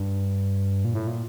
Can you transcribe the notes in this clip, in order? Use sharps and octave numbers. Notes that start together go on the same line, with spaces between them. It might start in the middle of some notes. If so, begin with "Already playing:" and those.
Already playing: G2
A#2
A2
A#2